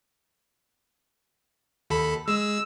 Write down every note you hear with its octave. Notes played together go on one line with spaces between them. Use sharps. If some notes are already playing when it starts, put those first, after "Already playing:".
D#2 A4 B5
G#3 E6